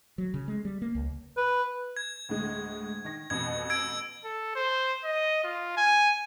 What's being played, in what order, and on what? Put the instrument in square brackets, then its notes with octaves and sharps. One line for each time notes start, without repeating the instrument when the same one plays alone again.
[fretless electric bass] F#3
C#3
G#3
G3
A#3
C#2
[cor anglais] B4
[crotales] G#6
[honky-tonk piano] D2 A2 G#3
D#3 A#6
[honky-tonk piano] A1 F2 B2 [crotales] G#6
[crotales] E6 G#6 D7
[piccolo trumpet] A4
C5
D#5
F4
G#5